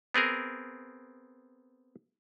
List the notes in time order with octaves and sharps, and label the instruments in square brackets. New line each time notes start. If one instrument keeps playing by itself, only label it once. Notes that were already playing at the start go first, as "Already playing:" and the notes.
[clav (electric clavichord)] B3 C4 G#4 A#4